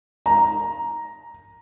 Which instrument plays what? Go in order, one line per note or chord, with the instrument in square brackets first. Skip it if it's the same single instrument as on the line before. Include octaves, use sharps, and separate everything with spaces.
[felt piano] A#5